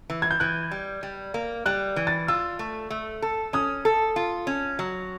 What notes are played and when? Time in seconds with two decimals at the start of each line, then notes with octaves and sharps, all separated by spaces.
0.10 E3
0.22 G#6
0.31 G6
0.40 E3 F#6
0.71 G3
1.03 G3
1.34 A#3
1.66 G3 F#6
1.96 E3
2.07 A6
2.28 F4 E6
2.59 A3
2.90 A3
3.22 A4
3.53 C#4 D#6
3.85 A4
4.16 F4
4.47 C#4
4.79 F#3